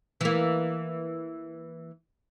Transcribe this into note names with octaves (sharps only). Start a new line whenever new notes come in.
E3 A#3